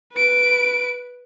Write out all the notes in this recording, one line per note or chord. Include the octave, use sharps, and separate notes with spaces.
B4 D7